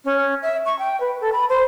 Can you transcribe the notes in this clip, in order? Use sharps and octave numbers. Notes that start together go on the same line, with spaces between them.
C#4
E5
C#6
G5
B4
A4
B5
C5